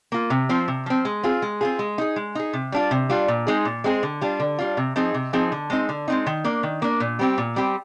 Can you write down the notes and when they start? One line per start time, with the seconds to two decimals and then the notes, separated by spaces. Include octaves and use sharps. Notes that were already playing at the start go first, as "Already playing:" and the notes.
0.12 A#3 F4
0.30 C3
0.49 F3 C4
0.68 C3
0.86 F3 C4
1.05 G#3
1.23 C4 F4 G#4
1.42 G#3
1.61 C4 F4 G#4
1.79 G#3
1.98 D#4 G#4
2.16 G#3
2.35 D#4 G#4
2.53 C3
2.72 G3 D4 F4
2.91 C3
3.09 G3 D4 F4
3.28 A#2
3.47 G#3 C4 D#4 G#4
3.65 A#2
3.84 G#3 C4 D#4 G#4
4.03 D3
4.21 G3 D4 F4
4.40 D3
4.59 G3 D4 F4
4.77 C3
4.96 F3 C4 D#4 G#4
5.14 C3
5.33 F3 C4 D#4 G#4
5.52 D3
5.70 G#3 C4 D#4
5.89 D3
6.08 G#3 C4 D#4
6.26 D#3
6.44 A#3 D4
6.63 D#3
6.82 A#3 D4
7.00 A#2
7.19 G3 C4 G4
7.38 A#2
7.56 G3 C4 G4